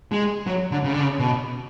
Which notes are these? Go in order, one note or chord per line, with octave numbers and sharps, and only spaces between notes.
G#3
F#3
D3
C#3
D3
C#3
B2